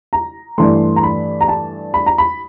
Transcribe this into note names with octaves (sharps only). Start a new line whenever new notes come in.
A#5
G2 E3 A3 C6
A#5
B5
A#5
A5
B5
A#5
B5